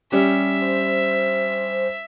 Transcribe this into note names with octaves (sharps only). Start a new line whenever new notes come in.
G3 C#4 G4 E5
C5